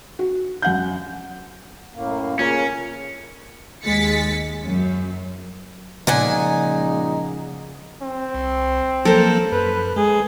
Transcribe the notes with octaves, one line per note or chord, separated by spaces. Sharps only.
F#4
F#2 F#5 G6
F#2 A2 A#3
A#2 C#3 C#4 A#4 C#5 G#6
D#2 G#3 A6 B6 C#7
F#2
A#2 C#3 F3 G#3 C#4 D#4 F#5 G#5
C4
C2
F3 F#3 A#3 A4 A#4 C5
F#2 B4
G#3 G#4